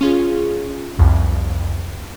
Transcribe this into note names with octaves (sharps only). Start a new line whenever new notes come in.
C#4 F4 G#4
C2 F2